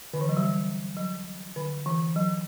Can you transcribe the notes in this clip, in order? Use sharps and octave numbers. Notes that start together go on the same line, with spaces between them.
D3
E3
F#3
G3
F#3
D3
E3
F#3